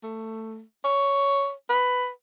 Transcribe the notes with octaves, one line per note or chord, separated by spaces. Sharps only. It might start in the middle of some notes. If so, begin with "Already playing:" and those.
A3
C#5
B4